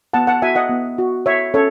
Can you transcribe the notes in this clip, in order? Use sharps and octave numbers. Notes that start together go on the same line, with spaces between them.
B3 F#5 A5
F#5 A5
F#4 E5 G#5
D#5 F#5
B3
F#4
F#4 C#5 E5
C#4 A4 C#5